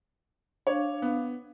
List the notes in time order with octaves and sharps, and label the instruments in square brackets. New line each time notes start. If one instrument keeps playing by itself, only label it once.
[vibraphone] D4 F5 [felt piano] C#5
[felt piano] B3